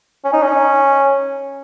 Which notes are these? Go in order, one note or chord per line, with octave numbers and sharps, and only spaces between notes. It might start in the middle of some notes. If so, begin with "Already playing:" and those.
C#4
D#4
C#4